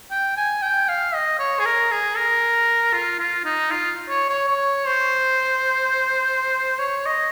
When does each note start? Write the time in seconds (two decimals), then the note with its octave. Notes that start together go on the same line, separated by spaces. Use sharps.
0.11 G5
0.37 G#5
0.62 G5
0.89 F5
1.15 D#5
1.39 C#5
1.59 G#4
1.65 A#4
1.91 G#4
2.17 A#4
2.93 F4
3.19 F4
3.45 D#4
3.71 F4
4.09 C#5
4.30 C#5
4.48 C#5
4.87 C5
6.79 C#5
7.06 D#5